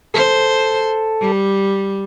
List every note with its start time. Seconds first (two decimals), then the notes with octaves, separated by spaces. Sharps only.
0.14 A4 C5
1.21 G3